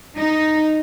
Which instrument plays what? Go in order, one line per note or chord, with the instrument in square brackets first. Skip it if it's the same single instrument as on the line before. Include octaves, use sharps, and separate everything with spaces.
[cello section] D#4